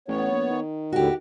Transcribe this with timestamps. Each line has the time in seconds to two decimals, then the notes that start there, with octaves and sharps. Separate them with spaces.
0.08 A1 B3 C#5
0.32 A#1
0.50 D#3
0.92 D#2 A2 D3 F#4 G4